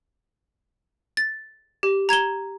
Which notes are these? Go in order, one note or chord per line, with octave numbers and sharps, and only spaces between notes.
A6
G4
A#5 G#6 E7 G7